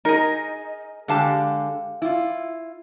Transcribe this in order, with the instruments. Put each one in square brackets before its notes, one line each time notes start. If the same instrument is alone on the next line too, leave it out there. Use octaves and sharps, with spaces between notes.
[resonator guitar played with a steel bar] D#4 [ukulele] G#4 A#4
[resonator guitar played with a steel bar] D3 G#3 G4 [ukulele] A4 F5 A5
[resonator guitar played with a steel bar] E4 F4